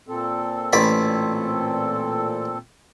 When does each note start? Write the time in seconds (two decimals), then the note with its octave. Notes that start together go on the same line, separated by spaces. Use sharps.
0.08 A#2 C4 A4
0.73 A1 D5 B5